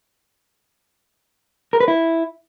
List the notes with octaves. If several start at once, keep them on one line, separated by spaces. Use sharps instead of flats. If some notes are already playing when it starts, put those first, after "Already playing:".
A#4
B4
E4